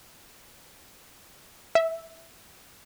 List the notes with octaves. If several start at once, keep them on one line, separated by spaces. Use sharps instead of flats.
E5